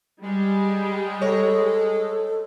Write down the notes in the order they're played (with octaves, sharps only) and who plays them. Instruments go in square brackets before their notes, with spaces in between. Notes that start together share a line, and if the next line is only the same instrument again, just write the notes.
[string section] G3 [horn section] G#3
[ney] A4 [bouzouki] C#5 D#5